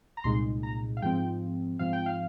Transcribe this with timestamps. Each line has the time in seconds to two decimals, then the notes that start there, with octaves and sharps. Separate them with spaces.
0.17 A#5
0.24 C2 A#2 G#3 D#4 C6
0.63 A#5
0.97 F5
1.02 G#2 F3 C4 G5
1.79 G#2 F3 C4 F5
1.93 G5
2.06 F5